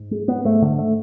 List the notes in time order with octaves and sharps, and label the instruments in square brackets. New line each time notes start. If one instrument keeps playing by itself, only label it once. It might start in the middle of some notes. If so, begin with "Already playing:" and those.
Already playing: [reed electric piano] G#2
[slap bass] G#3
B3
[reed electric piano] G#2 [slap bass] A3
[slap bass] D3
A3